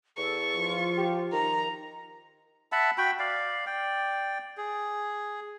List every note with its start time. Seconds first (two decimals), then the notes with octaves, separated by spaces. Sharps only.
0.17 E2 A4 C#6
0.57 F3 F4
0.98 G4
1.33 D#3 A#5
2.72 E5 F#5 A5 B5
2.98 F#4 G5 B5
3.19 D5 F5
3.66 D5 G5
4.57 G#4